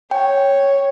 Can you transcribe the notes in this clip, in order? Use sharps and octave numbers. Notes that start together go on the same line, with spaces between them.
C#5 G5